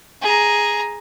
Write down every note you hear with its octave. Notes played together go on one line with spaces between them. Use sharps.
G#4 A#5